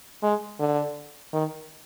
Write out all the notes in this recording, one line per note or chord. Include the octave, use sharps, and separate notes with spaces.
G#3
D3
D#3